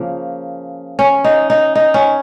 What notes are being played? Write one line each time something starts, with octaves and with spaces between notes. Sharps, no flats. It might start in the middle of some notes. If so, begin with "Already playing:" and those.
Already playing: C#3 F3 A#3
C#4
D#4
D#4
D#4
C#4